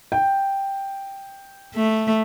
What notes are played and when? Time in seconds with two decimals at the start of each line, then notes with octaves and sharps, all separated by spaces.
0.12 G5
1.75 A3